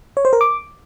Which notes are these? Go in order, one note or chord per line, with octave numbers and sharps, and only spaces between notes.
C#5
C5
A#4
D6